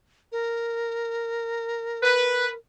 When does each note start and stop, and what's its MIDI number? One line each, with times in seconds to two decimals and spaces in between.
0.32 2.56 70
2.03 2.49 71